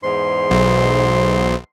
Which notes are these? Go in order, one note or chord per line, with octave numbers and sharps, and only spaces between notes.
E2 G#2 C5 C6
B1